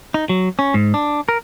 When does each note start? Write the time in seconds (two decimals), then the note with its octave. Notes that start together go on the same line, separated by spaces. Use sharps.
0.14 D#4
0.29 F#3
0.59 C#4
0.74 G#2
0.94 D4
1.29 A#4